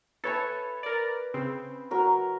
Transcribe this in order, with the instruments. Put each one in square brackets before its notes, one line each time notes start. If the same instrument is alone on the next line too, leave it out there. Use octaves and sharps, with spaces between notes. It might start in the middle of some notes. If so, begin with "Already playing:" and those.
[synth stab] A4 C#5 [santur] B4 G#5
[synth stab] A#4 D5
C#3 C4
[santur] F#3 A#4